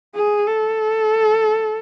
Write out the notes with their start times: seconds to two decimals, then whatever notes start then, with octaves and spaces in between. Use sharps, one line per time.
0.16 G#4
0.48 A4